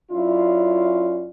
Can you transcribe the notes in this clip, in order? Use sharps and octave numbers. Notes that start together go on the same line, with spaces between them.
F#2 C#4 E4 F4 D5